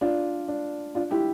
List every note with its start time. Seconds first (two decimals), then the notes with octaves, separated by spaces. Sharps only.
0.01 D4 F4
0.48 D4
0.95 D4 F4
1.11 E4 G4